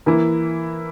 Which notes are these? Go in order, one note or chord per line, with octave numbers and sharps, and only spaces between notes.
E3 A#3 E4